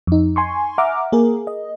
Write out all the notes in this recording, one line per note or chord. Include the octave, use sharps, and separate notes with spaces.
F2 D#4
G#5 C6 C#6
E5 F#5 A#5 D6 F6
A#3 G#4 A#4
D#5